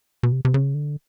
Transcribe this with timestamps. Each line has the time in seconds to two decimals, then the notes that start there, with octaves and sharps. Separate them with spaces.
0.23 B2
0.32 C3
0.45 C3
0.54 C#3
0.74 D3